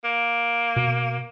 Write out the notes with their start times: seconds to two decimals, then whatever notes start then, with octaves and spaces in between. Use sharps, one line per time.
0.04 A#3
0.76 B2